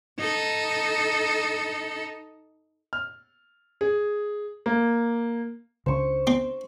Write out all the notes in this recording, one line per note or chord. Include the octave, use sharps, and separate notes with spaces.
D#4 A4
F6
G#4
A#3
C#2 C#3 C5 C#6
C4